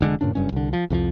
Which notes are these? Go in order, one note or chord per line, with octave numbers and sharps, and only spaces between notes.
F1 D3 G#3 D4
G2 A#2 C#3 D4
F#1 G2 C#3 C#4
C2 D3
F3
C2 F2 E3 F3